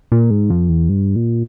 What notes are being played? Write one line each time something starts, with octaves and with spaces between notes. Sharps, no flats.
A#2
G#2
F2
E2
G2
A#2